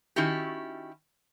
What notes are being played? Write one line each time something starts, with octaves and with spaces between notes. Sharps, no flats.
D#3 C#4 E4 F#4 G4